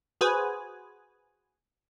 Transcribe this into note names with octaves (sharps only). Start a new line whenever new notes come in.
F#4 G#4 B4 C5 G#5